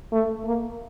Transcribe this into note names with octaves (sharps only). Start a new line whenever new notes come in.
A3
A#3